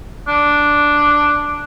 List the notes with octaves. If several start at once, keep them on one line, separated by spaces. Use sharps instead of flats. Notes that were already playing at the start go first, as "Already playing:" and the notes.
D4